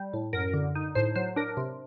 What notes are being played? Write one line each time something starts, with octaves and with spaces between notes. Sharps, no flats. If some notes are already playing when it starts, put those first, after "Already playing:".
Already playing: G3
A2
F#2 A#4
D3
D#4
A2 C5
F#3 C5
D4 A#4
C3